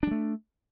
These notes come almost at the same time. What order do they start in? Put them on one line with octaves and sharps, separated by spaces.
D4 G3 A3